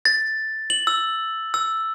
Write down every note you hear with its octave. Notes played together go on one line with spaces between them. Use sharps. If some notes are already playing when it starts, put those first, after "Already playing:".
A6
F#7
E6
E6